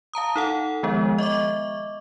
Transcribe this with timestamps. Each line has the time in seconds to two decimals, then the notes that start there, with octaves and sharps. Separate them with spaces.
0.13 F5 A5 A#5 D#6
0.36 D#4 A4 F#5
0.83 D#3 F3 G#3 B3
1.18 D#5 E5 C#6 D6